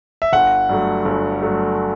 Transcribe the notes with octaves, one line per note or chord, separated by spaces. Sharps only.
E5
G1 F#5
G2 F#3 A3
G1
G2 F#3 A3